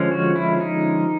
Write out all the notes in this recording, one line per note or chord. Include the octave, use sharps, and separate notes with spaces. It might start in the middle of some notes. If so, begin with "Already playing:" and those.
Already playing: D3 F3 G#3 C#4
F#4
E4
D#4